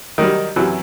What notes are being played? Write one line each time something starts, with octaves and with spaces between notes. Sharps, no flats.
D#3 F#3 G3
F#2 C3 E3 F#3